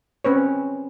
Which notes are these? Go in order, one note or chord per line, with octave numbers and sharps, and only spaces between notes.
C4 C#4 B4 C#5